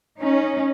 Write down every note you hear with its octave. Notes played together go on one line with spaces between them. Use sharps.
C#4 D#4